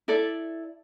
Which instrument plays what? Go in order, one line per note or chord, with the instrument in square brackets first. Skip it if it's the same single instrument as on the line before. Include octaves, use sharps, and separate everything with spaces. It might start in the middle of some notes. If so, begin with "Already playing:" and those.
[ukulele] E4 A4 D5